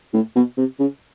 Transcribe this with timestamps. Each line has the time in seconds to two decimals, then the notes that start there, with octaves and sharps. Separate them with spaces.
0.14 A2
0.36 B2
0.58 C3
0.80 C#3